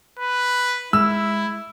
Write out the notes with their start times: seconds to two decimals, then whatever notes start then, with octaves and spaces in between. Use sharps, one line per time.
0.19 B4
0.93 G#3 E4 E6